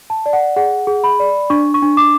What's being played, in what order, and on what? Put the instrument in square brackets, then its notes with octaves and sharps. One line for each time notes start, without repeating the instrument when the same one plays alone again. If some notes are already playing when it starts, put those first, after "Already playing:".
[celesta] A5
D5
F#5
G#4 F#5
G#4
B5
D5
D4 C#6
C#6
D4
D6